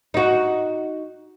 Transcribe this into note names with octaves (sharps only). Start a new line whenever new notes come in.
D#4 F#4